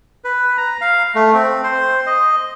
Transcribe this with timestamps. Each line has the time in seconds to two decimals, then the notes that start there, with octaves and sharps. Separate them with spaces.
0.24 B4
0.57 A#5
0.81 F5
1.15 A3
1.34 C4
1.63 C5
2.06 D#5